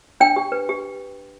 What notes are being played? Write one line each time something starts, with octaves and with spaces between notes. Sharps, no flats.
D4 G5
G4
B4
G4